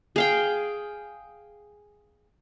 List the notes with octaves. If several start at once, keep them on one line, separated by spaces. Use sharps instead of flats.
G#4 F5 G5